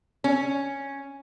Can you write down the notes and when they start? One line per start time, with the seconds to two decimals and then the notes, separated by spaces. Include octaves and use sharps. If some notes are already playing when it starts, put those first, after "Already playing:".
0.24 C#4